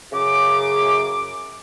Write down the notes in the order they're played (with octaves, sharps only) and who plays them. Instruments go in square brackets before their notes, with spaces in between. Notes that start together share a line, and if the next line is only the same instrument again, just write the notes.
[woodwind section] F#2 C#3 D6